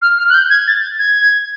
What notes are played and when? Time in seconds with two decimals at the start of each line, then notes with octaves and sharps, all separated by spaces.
0.02 F6
0.18 F6
0.30 F#6
0.34 G6
0.50 G#6
0.67 A6
0.99 G#6